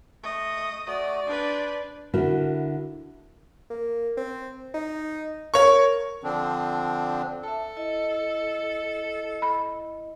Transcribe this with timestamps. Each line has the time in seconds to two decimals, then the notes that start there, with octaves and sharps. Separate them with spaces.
0.24 A3 D#5 C#6
0.87 A3 F#4 D5 D#6
1.27 D4 B4 C5
2.14 D3 E4 F#4 A#4
3.70 A#3
4.17 C4
4.74 D#4
5.54 A#4 C#5 C#6
6.24 D3 F3 C4 D4
7.44 A4 E5 A5
7.77 E4 D#5
9.42 B5